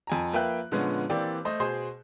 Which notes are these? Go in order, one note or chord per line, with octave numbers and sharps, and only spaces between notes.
F2 G#5 A#5
F3 A#3 B4 E5 G5 F#6
A#2 D3 F3 G#3 B3 C#4
E3 A#3 C4 G4 D5
A3 C5 D#5
B2 G#4 C5 C6